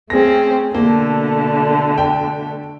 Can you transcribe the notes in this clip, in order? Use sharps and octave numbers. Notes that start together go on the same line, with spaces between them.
A3 C4 C#4 G#4 A#6
B2 D3 A3 A#3
G5